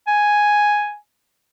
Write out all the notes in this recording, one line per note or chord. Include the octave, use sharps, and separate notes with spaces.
G#5